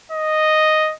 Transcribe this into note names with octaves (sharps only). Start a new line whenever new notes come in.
D#5